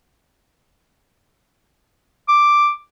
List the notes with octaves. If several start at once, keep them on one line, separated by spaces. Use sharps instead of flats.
D6